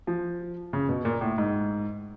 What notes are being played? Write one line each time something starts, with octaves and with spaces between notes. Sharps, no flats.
F3
C#3
B2
A#2
A2
G#2